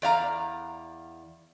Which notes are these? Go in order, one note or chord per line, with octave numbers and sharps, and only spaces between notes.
E2 D5 F5 A#5